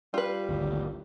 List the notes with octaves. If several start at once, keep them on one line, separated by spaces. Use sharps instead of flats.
G3 F4 B4
G#1 D2